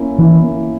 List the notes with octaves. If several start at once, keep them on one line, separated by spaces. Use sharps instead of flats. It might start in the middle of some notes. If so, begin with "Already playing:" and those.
Already playing: A#3 C#4 E4
E3 E4
A#3